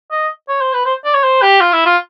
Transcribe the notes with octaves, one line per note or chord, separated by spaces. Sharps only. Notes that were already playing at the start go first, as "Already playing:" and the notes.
D#5
C#5
C5
B4
C5
D5
C#5
C5
G4
F4
E4
F4